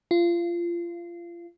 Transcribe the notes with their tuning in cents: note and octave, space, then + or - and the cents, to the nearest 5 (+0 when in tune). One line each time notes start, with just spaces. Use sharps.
F4 -25